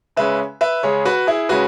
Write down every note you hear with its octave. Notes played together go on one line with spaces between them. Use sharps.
C#3 G#3 C#4 B4 E5
B4 E5
C#3 G#3 C#4 G#4 C#5
F#4 B4
E4 G#4
C#3 G#3 C#4 F#4 B4